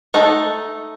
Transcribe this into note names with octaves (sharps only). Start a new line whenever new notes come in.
A3 D#4 A4